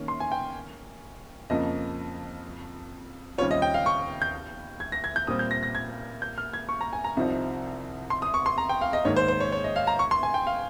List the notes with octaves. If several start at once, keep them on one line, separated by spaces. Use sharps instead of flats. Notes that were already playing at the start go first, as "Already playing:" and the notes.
Already playing: D#3 A#3 C#4
C6
G#5
G5
F2 C#3 F3 A#3 D#5
D#2 C#3 G3 C4 F4 C#5
D#5
G5
F5
C#6
G6
G#6
A#6
G#6
G6
A#2 G3 C4 D#6
G6
A#6
A#6
G#6
G6
F6
G#6
C#6
A#5
G#5
A#5
C2 C3 F3 C4 D#4
C6
D#6
C#6
C6
A#5
G5
F5
D#5
G#2 D#3 A#3 C#5
C5
C5
C#5
C#5
D#5
F5
A#5
C#6
C6
G#5
G5
F5